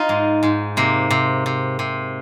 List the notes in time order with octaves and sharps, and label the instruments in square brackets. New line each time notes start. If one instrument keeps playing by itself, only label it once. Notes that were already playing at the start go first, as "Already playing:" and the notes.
Already playing: [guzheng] D#4 F4
G#2
G#2
C3 A#3
C3
C3
C3